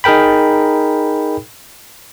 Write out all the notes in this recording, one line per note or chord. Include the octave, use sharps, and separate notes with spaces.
D#4 G#4 A#4 G5 B5